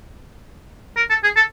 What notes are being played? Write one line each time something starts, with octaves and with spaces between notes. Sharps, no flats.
A#4
A4
G#4
A4